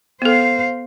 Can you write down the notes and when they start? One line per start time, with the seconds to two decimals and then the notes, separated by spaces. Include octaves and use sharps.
0.22 B3 A4 C5 F5